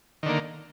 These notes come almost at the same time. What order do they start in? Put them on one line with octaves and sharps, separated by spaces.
D#3 D3 A#3